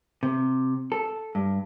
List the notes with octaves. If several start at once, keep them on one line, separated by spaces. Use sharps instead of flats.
C3
A4
G2